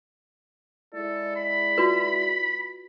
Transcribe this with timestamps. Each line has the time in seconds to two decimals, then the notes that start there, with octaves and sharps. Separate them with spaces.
0.94 G#3 E4 A4 D5
1.36 B5
1.78 F4 F#4 B4